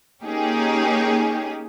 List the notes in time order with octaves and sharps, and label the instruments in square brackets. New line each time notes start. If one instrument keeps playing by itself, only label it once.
[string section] A#3 C#4 D#4 G4 G#4